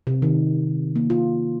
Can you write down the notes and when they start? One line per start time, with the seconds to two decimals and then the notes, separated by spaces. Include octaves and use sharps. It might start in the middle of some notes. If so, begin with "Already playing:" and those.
0.07 C3
0.22 D#3
0.96 A#3
1.10 F4